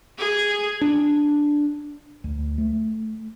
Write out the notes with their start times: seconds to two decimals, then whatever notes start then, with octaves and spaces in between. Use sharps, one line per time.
0.18 G#4
0.81 D4
2.24 D2
2.58 A3